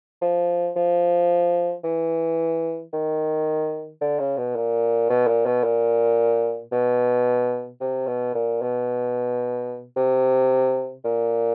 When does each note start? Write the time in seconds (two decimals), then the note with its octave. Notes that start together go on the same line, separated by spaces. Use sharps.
0.21 F3
0.76 F3
1.84 E3
2.93 D#3
4.01 D3
4.19 C#3
4.37 B2
4.56 A#2
5.09 B2
5.27 A#2
5.45 B2
5.64 A#2
6.72 B2
7.80 C3
8.07 B2
8.34 A#2
8.62 B2
9.96 C3
11.05 A#2